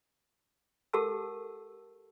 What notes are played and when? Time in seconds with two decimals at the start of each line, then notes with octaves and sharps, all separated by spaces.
0.93 G4 A4 A#4 F#5 A5 E6